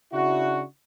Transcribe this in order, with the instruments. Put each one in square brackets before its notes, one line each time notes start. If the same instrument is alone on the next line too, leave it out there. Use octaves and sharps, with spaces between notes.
[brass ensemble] C#3 D4 E4 F#4